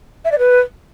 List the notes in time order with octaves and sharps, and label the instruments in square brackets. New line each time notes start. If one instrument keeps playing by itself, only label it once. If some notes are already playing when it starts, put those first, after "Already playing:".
[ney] E5
D5
B4